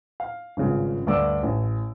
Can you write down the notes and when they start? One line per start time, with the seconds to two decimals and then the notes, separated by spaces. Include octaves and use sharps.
0.20 F5
0.57 G#1 G2 C#3 F4
1.07 D2 G2 A3 D5 D6 E6
1.43 A1